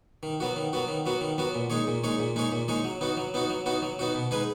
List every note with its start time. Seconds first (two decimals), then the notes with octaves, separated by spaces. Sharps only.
0.23 D#3
0.40 F#3 B3 F#4
0.56 D#3
0.73 F#3 B3 F#4
0.88 D#3
1.06 F#3 B3 F#4
1.21 D#3
1.38 F#3 B3 F#4
1.55 A#2
1.70 G#3 D#4 G#4 C#5
1.87 A#2
2.04 G#3 D#4 G#4 C#5
2.19 A#2
2.36 G#3 D#4 G#4 C#5
2.52 A#2
2.68 G#3 D#4 G#4 C#5
2.84 F#3
3.01 B3 D#4 F#4
3.17 F#3
3.34 B3 D#4 F#4
3.50 F#3
3.66 B3 D#4 F#4
3.82 F#3
3.99 B3 D#4 F#4
4.15 B2
4.31 G#3 D#4 G#4 B4